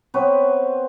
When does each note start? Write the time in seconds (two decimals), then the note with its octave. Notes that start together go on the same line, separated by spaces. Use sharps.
0.14 B3 C4 B4 C#5